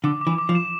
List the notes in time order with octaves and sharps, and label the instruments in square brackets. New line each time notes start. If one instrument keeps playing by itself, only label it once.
[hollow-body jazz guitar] D3 [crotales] D6
[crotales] D6
[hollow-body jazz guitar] E3
[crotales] D6
[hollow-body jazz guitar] F3
[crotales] E7